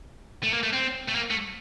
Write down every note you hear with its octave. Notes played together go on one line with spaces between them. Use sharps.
A3
A#3
A3
C4
A3
A#3
A3